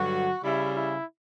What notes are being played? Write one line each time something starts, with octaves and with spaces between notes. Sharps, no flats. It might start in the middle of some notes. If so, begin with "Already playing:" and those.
Already playing: G2 D3 F#3 F#4
C#3 G3 E4
E4